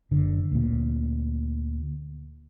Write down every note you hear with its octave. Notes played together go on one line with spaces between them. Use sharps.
F#1 D3
D2 A#2